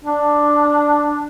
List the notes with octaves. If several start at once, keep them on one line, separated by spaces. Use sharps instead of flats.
D4